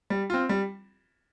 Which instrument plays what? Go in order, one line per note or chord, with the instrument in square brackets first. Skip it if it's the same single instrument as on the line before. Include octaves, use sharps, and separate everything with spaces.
[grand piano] G3
C4 F4
G3